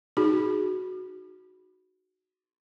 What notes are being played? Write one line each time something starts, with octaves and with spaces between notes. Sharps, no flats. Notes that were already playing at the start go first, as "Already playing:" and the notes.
D#4 F#4 G#4